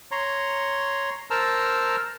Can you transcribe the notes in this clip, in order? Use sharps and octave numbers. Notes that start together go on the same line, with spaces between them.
C#5 A#5 C6
A#4 C5 A5 A#5 E6 F6